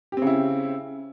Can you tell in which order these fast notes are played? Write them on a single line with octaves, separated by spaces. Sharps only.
G4 C4 C#3 E4